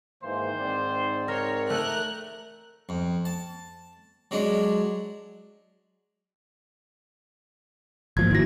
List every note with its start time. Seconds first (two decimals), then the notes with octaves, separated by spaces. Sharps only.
0.23 G#2 D#3 E3 A#3 C5
0.59 G#2 C4 D5
1.28 A#4 C#5
1.70 A3 A#4 F#6
2.89 F2
3.25 A5
4.31 F#3 G#3 D4
8.17 G#1 F3 A#3 G#6
8.31 D#3 E4 F#4 A#6